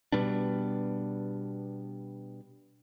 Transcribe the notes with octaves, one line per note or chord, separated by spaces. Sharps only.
B2 G3 B3 D4